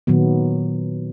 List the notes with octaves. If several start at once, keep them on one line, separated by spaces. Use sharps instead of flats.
A#2 D#3 F#3 B3